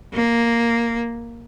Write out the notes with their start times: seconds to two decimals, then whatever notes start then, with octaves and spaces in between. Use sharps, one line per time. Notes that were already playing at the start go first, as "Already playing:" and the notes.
0.14 A#3